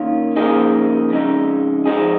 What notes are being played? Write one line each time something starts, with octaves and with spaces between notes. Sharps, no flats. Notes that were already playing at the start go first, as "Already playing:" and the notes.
Already playing: D#3 A#3 C#4 F4
C#3 F3 A#3 D#4 G#4
F2 C#3 G#3 D#4
F2 F3 G#3 D#4 G#4